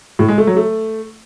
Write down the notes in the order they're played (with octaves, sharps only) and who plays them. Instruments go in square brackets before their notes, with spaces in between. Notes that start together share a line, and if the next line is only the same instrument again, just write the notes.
[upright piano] A2
G#3
A3
F#3
A3